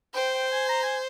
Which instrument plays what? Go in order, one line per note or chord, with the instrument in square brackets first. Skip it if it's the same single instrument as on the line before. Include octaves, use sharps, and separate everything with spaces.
[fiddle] C5 [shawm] G5
[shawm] G5
G#5
A#5
G#5